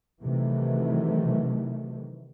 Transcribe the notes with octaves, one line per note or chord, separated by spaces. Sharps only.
C3 D#3 E3 F#3 A3